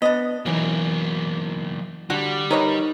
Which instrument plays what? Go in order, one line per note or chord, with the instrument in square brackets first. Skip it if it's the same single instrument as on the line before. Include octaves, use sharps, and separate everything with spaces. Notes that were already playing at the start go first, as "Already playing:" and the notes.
[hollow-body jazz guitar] B3 [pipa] D4 D#5
[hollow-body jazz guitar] B1 E3 [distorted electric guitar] F#3 A#3
[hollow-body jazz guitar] D3 [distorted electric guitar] G3 [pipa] F#4
[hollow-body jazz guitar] D#4 A#4 A#5 [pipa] B4 C#5 D#5